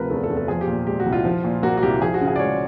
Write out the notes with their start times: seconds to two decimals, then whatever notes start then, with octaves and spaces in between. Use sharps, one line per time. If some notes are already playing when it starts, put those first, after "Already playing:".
Already playing: D2 C3 F3 A#4 B4
0.10 E2 A4
0.23 A4
0.30 E2
0.37 A4
0.48 F3 G#4
0.61 G4
0.67 A#2
0.87 G#3 G4
1.00 F#4
1.06 C2
1.13 F4
1.25 F3
1.44 A#2
1.63 A#3 F#4
1.77 F#4
1.83 C2 G4
2.01 F3 G#4
2.14 F#4
2.21 C#3
2.28 G#4
2.36 D5
2.39 G#3 C#5